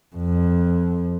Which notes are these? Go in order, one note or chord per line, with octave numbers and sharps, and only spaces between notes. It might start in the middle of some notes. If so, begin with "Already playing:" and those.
F2